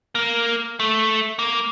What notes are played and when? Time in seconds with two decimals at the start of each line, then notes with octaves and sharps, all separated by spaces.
0.15 A#3
0.80 A3
1.39 A#3